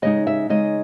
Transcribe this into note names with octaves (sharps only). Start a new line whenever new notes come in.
C#3 G#3 D#4 D#5
E5
C#3 G#3 D#4 D#5